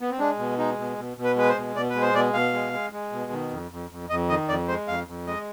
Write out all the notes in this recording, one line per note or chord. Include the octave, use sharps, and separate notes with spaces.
B3
C4
G#3 D4
B2
G#3 D#4
B2
B2
B2
B4
G#3 B4
C5
B2
B2 D5
B4
G#3
C5
B2 D5
B2 F5
G#3
G#3
G#3
B2
D#3
F2
F2
F2
F2 D#5
D#3 D#5
F2 D5
G#3 C5
F2 F5
F2
G#3 D#5